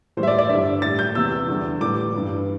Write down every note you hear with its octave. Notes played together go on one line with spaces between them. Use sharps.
A2 E3 G3 C5
E5
D5
D5
G2 D3 G3 E5
A2 G3 A6
G6
E2 C3 E3 E6
E2 D3 G3
A2 E3 G3 D6
G2 E3 G3